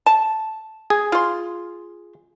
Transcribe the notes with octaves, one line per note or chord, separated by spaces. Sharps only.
A5
G#4
F4 C6